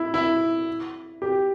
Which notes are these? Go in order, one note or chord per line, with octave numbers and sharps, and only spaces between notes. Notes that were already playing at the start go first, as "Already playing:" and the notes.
Already playing: E4
E4
G4